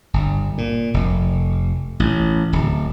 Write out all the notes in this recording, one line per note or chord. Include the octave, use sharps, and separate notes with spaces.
G1
A#2
F1
A1
D1